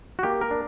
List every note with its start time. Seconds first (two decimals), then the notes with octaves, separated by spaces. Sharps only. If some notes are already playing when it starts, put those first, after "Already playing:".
0.19 F#4
0.23 A#3 G4
0.41 A#4
0.51 D4